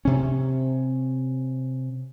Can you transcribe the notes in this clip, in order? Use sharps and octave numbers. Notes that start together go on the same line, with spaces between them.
C3 C#4